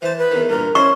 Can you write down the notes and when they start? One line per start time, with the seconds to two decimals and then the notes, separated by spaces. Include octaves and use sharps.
0.02 E3 C5 A5
0.17 B4
0.31 E2 D#3
0.49 G2 A#2 A#4
0.75 C#4 E4 C5 D#5 C#6